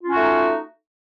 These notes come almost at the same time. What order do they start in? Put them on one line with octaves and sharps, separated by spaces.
F4 C#4 F#4 A3 D#4